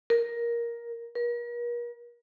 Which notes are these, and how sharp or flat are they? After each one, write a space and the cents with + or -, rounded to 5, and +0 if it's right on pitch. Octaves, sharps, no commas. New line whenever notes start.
A#4 +10
A#4 +40